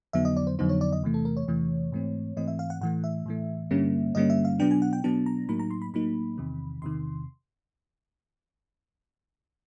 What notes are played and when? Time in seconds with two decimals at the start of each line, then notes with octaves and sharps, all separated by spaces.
0.13 F2 D3 F#3 B3 D#4 E5
0.25 D#5
0.37 D5
0.47 C5
0.59 F2 D3 F#3 B3 D#4 C5
0.69 C#5
0.81 D5
0.92 D#5
1.03 E2 C3 E3 A3
1.14 A4
1.25 A#4
1.37 C#5
1.48 E2 C3 E3 A3
1.92 G#2 E3 A3 C4
2.37 G#2 E3 A3 C4 D#5
2.48 E5
2.59 F5
2.70 F#5
2.81 A2 E3 A3 F#5
3.04 E5
3.26 A2 E3 A3
3.71 G2 D3 G3 A#3 C#4
4.15 G2 D3 G3 A#3 C#4 D#5
4.30 E5
4.45 F5
4.60 B2 F#3 B3 D4 G5
4.71 G#5
4.82 F#5
4.93 G5
5.04 B2 F#3 B3 D4 A5
5.26 A#5
5.49 A2 F#3 A#3 D#4 B5
5.59 A#5
5.71 C6
5.82 B5
5.94 A2 F#3 A#3 D#4 B5
6.38 E2 C3 D#3
6.82 E2 C3 D#3 C6